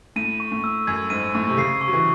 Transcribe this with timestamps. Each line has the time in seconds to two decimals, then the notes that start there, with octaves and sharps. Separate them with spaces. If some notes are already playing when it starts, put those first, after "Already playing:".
0.16 A2 D#7
0.40 C#6
0.52 A2
0.64 E6
0.87 F#2 G#6
1.10 G#2 D#7
1.35 A2 C#6
1.49 C3
1.57 C#3 C7
1.81 C#6
1.88 F#3
1.93 E3